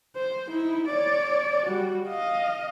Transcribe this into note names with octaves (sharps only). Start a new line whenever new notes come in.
C5
D#4 E4
C#5 D5
G3 F#4
D#5 F5